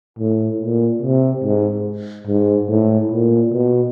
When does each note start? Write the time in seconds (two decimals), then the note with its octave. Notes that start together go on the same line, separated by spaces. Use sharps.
0.19 A2
0.60 A#2
1.02 C3
1.44 G#2
2.27 G#2
2.69 A2
3.11 A#2
3.52 B2